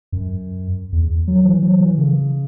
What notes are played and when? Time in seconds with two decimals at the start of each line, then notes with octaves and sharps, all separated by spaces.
0.12 F#2
0.92 E2
1.28 F#3
1.45 E3
1.63 F#3
1.80 E3
1.98 C#3